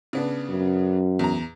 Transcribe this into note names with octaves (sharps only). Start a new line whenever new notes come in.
C#3 B3 D4
F#2
E2 A#5